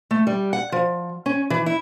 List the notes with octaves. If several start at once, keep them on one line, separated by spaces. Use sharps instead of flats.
A3
G3
F#5
F3
C#4
E3
E4